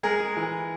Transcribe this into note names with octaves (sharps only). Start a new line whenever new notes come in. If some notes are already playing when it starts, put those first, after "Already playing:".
G#3 G#4 A#4
G#3
E3